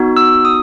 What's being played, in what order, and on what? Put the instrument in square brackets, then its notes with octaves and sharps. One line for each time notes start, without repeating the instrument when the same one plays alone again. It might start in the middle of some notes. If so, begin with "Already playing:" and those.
Already playing: [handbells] B3 D#4 F#4
E6
D#6